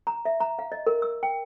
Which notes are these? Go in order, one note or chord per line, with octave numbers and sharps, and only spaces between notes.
A#5
E5
A#5
F5
D#5
A#4
E6
G5